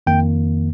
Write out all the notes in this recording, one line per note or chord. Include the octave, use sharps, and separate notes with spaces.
F2 D#3 A#3 G5